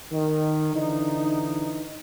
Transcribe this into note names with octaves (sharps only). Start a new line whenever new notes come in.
D#3
D3 E3 D#4